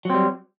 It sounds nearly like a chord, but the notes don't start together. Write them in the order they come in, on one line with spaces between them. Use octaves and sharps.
F#3 C4 G3